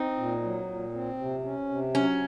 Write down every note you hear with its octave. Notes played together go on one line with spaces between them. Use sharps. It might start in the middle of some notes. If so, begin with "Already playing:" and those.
Already playing: C4 D#4
A#2
F#3
A#2
C4
C3
C#4
C3
F#3 C#4